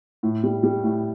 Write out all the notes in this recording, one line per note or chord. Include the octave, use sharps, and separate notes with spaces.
A2
G3
G3
A2